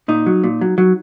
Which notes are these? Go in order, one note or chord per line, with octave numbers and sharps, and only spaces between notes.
A#2 D#4
F#3
A#2
F#3
F#3